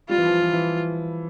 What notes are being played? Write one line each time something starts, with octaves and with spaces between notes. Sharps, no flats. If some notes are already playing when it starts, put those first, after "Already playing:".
G3 F4
E3
F3
E3
E3